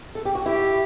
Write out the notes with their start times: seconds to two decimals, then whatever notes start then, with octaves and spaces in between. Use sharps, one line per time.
0.15 A4
0.25 G4
0.35 F#4
0.46 E4 G4